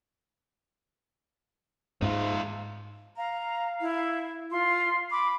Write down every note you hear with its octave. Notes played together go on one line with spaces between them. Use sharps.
G#2 D#4 F4
F5 A#5
E4
F4 C6
B5 D6